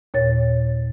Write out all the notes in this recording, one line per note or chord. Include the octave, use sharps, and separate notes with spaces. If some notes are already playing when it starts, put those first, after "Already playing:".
D#2 A#2 C#5 A6